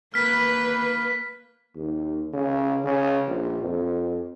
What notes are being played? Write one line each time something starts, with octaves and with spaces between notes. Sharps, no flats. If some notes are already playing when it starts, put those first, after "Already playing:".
A#3 B4 F6 B6
D#2
C#3
C#3
A#1
F2